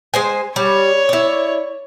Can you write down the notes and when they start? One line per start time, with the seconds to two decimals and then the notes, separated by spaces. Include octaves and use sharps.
0.14 G#3 C5 G#5
0.56 G3 C#5
1.09 E4 D5